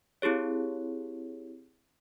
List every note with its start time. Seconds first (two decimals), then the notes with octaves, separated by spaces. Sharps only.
0.22 C4 E4 G4 G#4 C#5